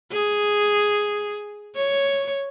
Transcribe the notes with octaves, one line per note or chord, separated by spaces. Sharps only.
G#4
C#5